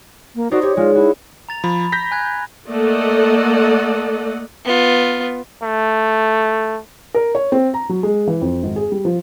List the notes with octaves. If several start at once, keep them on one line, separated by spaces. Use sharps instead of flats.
A#3
D#4 F#4 C5 D5
G4 C#5
G#3 F4
E4 F#4
A#5 A6 F7
F3 B5
G6 A#6 B6
G#5 F#6 G#6
A3 A#3 A4 D5 D#5 F#5
B3 F4
A3
A#4
C#5
C4
A#5
F#3
G#3
E3
F2
G#1
G#4
G3
F3